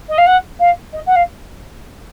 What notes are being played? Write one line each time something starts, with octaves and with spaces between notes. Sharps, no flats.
D#5
F5
F#5
F5
D#5
F#5
F5